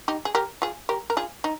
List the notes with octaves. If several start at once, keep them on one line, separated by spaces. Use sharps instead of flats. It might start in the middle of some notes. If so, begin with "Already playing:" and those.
D#4 G4
G#4
G4 A#4
F4 G#4
G4 A#4
A#4
F4 G#4
D#4